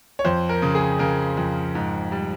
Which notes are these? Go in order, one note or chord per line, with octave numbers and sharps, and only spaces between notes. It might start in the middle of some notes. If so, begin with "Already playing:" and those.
C#5
F2 C5
A#4
C#3
G#4
C#3 A#4
F2
G#2
G3